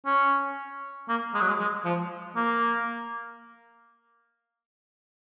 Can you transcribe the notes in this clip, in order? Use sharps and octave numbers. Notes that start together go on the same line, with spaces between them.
C#4
A#3
G#3
F#3
G#3
G#3
F3
A#3